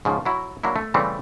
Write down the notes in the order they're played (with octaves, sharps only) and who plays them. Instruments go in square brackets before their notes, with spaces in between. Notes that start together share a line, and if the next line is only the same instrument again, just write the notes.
[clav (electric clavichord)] G#2 C#3 F3
F#3 E4 F#4
F#3 A#3 D4 E4
A3
C#3 E3 G3 A3 C4